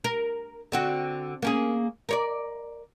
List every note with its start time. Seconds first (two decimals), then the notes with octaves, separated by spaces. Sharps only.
0.04 A#4
0.72 D3 C4 F#4
1.42 A#3 C#4 G#4
2.09 A#4 C#5 D5